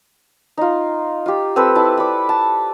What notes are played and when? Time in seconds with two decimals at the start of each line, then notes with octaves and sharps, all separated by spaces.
0.57 D#4 F4
1.26 F4 G4
1.56 C4 A4 B4 E6
1.75 E4 A5
1.97 D5 B5
2.29 A5